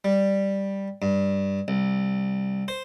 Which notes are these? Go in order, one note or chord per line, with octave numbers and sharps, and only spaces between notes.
G3
G2
C2
C5